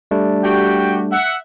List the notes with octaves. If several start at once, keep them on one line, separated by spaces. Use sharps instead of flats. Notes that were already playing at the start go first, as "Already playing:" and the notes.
G3 A3 D4
F#4 G4 G5
E5 F#5